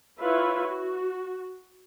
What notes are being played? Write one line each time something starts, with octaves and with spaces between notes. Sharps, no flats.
E4 F4 B4 C#5 E5
F#4